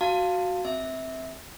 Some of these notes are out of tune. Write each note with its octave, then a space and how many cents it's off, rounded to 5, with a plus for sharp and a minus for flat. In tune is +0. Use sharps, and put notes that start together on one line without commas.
F#4 +0 F5 +0 A5 +20
C4 +0 E5 -20